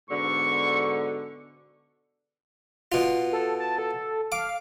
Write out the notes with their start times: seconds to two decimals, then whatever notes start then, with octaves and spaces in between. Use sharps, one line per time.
0.10 G#2 B2 D3 C#6
2.92 B2 F4
3.33 A4
3.60 A5
3.78 A4
4.32 F5 D6